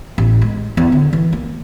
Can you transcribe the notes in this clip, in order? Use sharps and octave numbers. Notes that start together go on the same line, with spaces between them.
A1
G#3
E2
D3
E3
A#3